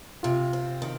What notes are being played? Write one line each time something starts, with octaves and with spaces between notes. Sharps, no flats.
C3 F4
C4
D#3